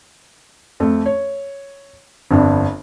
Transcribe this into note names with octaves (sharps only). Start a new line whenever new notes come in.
F2 A3
C#5
G1 F2 D4